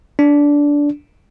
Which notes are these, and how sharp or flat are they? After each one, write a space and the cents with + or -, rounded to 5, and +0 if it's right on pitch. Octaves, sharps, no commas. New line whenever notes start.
D4 -15